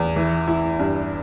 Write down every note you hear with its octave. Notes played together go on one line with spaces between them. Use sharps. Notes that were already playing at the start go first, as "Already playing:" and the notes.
Already playing: E2
E3
E4
G2